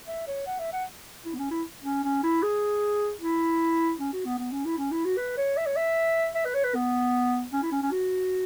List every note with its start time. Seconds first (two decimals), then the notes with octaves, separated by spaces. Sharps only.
0.08 E5
0.28 C#5
0.47 F#5
0.60 E5
0.73 F#5
1.26 E4
1.34 B3
1.38 C#4
1.51 E4
1.83 C#4
2.04 C#4
2.24 E4
2.43 G#4
3.21 E4
4.00 C#4
4.13 F#4
4.26 B3
4.39 B3
4.52 C#4
4.65 E4
4.78 C#4
4.91 E4
5.05 F#4
5.17 B4
5.37 C#5
5.57 E5
5.66 C#5
5.76 E5
6.35 E5
6.46 B4
6.54 C#5
6.64 B4
6.75 B3
7.53 C#4
7.63 E4
7.72 C#4
7.83 C#4
7.92 F#4